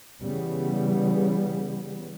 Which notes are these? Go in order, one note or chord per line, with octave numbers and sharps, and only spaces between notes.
C#3 E3 G3 B3